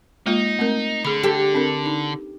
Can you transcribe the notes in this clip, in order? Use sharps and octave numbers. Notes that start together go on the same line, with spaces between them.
G#3 A#3 D#4 F4
A3 C4 A#4
D3 G#4 B5
G4 A4
C4 D4 A#4
D#4